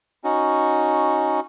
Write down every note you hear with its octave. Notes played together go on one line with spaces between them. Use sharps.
C#4 D#4 F#4